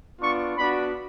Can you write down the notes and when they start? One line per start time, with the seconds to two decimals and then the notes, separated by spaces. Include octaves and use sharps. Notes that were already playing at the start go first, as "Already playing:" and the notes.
0.21 B3 D4 F4 C#6
0.57 B3 D4 F#4 B5